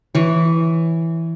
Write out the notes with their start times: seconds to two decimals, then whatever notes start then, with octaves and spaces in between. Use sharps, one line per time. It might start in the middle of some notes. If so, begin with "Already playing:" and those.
0.15 E3 C#5